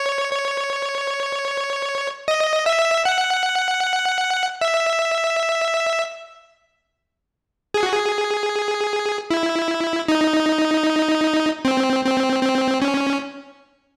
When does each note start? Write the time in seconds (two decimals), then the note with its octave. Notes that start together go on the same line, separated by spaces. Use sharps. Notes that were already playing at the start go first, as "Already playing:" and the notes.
Already playing: C#5
0.32 C#5
2.28 D#5
2.66 E5
3.05 F#5
4.61 E5
7.74 G#4
7.83 F#4
7.93 G#4
9.31 E4
10.08 D#4
11.65 C4
12.05 C4
12.43 C4
12.82 C#4